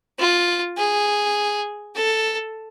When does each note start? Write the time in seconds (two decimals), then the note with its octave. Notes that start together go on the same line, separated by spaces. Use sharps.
0.19 F4
0.77 G#4
1.95 A4